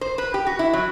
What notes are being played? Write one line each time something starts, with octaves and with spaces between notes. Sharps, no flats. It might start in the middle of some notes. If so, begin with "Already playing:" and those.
C5
B4
G4
F#4
E4
F#3